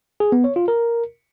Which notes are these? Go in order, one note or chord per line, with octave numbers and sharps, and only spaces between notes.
G#4
B3
C#5
F4
A#4